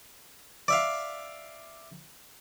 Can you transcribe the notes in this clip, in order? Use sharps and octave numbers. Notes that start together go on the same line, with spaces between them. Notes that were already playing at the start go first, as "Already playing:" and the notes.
D5 E5 F5